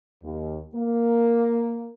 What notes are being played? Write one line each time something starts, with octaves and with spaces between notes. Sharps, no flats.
D#2
A#3